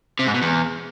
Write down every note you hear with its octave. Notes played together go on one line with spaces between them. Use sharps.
C3
G#2
B2
E2